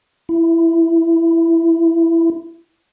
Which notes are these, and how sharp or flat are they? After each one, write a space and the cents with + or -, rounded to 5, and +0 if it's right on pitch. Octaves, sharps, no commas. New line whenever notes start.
E4 +10